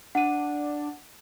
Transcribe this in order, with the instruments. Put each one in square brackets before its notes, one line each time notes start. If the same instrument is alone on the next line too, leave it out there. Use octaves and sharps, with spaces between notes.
[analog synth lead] D4 [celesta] F#5 D#7